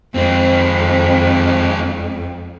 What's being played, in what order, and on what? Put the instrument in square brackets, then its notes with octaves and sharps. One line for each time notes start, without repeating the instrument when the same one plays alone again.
[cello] F2 [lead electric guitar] G#3 C4